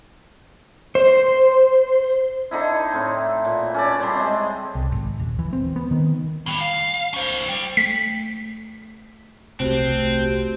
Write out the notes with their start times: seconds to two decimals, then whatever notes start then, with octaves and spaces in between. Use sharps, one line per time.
0.95 C5
2.51 D3 D#4 E4
2.93 A2 C4
3.45 A#2
3.74 C#4 A4 D5
4.00 C#3 G3 C5 G5
4.15 G#3 C4
4.75 C2
4.92 G#1
5.19 D#1
5.39 E3
5.53 C4
5.76 B3
5.91 D#3
6.46 A2 G3
6.61 F5
7.14 C#4 C5
7.49 G3
7.77 A3 B6
9.60 D#1 C2 C3 A3 C4 F#4 G4